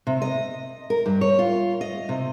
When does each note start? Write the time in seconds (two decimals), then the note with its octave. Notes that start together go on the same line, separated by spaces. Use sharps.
0.07 C3
0.22 D#5
0.90 A#4
1.06 G2
1.21 C#5
1.39 F4
1.81 D#5
2.09 C3